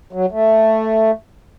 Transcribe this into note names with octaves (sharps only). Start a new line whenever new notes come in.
F#3
A3